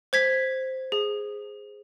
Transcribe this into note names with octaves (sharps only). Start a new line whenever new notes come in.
C5 G#6 B6
G#4